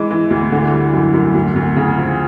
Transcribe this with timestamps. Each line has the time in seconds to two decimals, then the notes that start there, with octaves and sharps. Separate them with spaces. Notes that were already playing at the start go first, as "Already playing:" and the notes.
Already playing: E3 G#3
0.11 E3
0.30 D2
0.52 D3
0.72 G3
0.93 F#2
1.14 F#2
1.34 D2
1.56 D2
1.76 C#3
1.97 F3